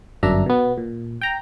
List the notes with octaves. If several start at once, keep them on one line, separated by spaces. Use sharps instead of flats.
G1 F#2 D4 E5 A#5
B2 B3
A#2
G5 A#5